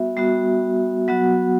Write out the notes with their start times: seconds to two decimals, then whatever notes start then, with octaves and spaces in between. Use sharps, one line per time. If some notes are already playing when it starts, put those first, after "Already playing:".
Already playing: G3 B3 F#4 E5
0.17 G3 B3 F#4
1.08 F#3 B3 F#4 F#5